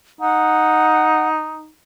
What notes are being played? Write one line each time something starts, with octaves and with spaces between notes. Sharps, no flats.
D#4 F#5